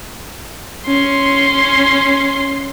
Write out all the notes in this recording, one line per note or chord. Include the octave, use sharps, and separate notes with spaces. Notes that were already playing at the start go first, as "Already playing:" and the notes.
C#4 C6